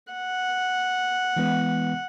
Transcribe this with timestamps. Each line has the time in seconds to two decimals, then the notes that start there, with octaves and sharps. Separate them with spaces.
0.13 F#5
1.36 E3 G#3 B3